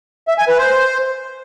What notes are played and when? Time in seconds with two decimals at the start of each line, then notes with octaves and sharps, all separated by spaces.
0.28 E5
0.38 G#5
0.48 B4
0.58 C5